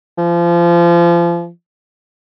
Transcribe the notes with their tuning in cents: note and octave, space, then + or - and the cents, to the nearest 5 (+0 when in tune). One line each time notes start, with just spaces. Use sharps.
F3 -30